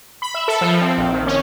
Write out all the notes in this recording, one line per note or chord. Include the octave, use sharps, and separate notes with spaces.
B5
E5
A4
F3
C4
A#1
D#3
C#4